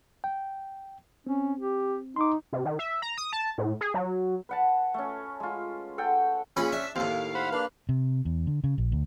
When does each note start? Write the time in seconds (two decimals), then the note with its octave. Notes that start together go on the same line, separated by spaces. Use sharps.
0.24 G5
1.27 C4 C#4
1.60 G4
2.16 D#4 C6 D6
2.53 C3
2.65 D#3
2.79 E5
3.02 A#5
3.18 D#6
3.33 A5
3.58 A2
3.81 G#4
3.94 F#3
4.49 B4 F#5 A5
4.94 A3 C#4
5.40 G#3 F4
5.98 A4 F#5 G5
6.57 A#2 C#4 G#4 B5
6.72 D4 E5
6.96 D#2 A2 C4 F5
7.11 A#4
7.35 C5 F#5 B5
7.52 A#3 D4 B4 F6
7.89 C3
8.25 E2
8.47 D3
8.64 C#3
8.78 A#1
8.92 D2